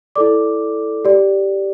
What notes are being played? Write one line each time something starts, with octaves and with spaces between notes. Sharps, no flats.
E4 A4 D5 D6
G4 D5